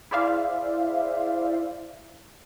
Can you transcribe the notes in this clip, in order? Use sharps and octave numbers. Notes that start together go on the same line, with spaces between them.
E4 G#4 C5 D5 E5 F5